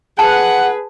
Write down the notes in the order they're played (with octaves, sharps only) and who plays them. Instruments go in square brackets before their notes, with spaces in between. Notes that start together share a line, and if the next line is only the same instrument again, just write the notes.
[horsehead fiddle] G#4 B4 [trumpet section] F#5 [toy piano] A5